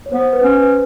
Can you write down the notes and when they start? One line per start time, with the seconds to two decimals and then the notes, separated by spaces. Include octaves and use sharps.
0.06 C#5
0.12 B3 C5
0.33 B4
0.43 C#4
0.55 B4